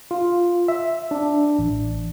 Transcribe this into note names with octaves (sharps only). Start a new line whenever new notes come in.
F4
E5
D4
A1